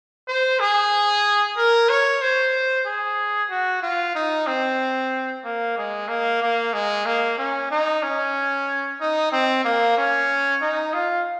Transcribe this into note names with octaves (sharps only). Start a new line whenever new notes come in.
C5
G#4
A#4
C#5
C5
G#4
F#4
F4
D#4
C4
A#3
G#3
A#3
A#3
G#3
A#3
C#4
D#4
C#4
D#4
C4
A#3
C#4
D#4
F4